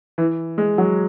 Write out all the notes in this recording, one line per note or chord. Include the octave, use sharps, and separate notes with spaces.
E3
G#3
F#3